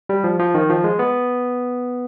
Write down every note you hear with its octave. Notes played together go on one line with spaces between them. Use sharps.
G3
F3
F3
D#3
F3
G#3
B3